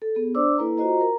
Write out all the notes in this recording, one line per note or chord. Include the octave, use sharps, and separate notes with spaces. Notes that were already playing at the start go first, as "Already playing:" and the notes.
A4
B3 G#4
D4 C5 D5 D6 E6
A#3 E4 A4 B4 A#5
F4 F#4 C5 D#5 A#5
A#4 A#5